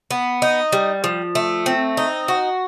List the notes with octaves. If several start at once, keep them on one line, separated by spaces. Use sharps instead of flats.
B3
D#4
G3
F3
A3
C4
D#4
F#4